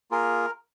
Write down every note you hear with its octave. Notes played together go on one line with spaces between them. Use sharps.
A#3 F4 G#4 A#4